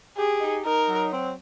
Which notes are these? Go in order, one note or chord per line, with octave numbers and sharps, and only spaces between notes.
G4 G#4
D#4
D#4 A#4
F#3
C4